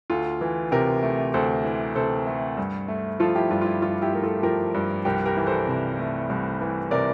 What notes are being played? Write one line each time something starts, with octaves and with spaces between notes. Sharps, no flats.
D2 F4 A4
E3
C3 G4 A#4
A3
D2 A4 C5
E3
C3 A4 C5
A3
G2
A3
F3 F4 A4
E4 G4
G2 F4
F4
E4
G2 F4
E4 G4
A3 A#4
F4 A4
F3 G4 A#4
G2
C2 G4 A#4
G4 A#4
E3
A4 C5
C3
A3
C2
E3
C3 A#4 D5